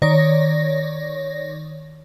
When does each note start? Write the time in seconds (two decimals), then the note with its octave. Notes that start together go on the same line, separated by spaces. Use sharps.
0.02 D#3 C#5 D5 A#6